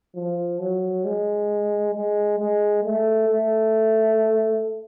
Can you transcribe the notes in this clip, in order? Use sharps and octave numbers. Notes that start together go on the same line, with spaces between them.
F3
F#3
G#3
G#3
G#3
A3
A3